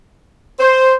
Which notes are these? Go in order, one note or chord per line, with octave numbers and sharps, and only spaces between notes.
C5